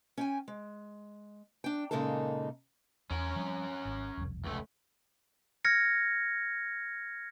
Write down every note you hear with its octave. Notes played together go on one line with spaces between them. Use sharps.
C#4 G5 G#5
G#3
D4 G5
A#2 C#3 G#3 A#3 D#4 A4
E2 C#4 A#4
F3 G3 C4
G#1
E1 C2 F2
C#2 A3
F6 G#6 A#6 C#7